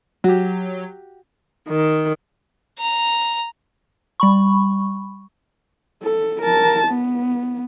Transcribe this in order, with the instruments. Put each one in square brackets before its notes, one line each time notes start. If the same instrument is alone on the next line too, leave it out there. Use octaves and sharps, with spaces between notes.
[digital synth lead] F#3 [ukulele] F#4 G4
[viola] D#3
[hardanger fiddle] A#5
[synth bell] G3 B5 C#6
[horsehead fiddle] A4
A#4 A5
B3